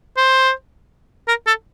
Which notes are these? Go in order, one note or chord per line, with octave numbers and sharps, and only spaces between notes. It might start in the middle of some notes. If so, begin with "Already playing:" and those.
C5
A#4
A4